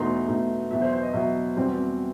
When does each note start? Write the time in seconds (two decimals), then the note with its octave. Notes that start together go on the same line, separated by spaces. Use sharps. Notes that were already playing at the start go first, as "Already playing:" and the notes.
Already playing: E2 B2 A3 D#4 C6
0.27 E2 B2 A3 D#4
0.70 E2 B2 F#3 E5
0.81 C5
0.92 C5
1.03 D#5
1.13 E2 B2 F#3 E5
1.56 E2 B2 G3 C4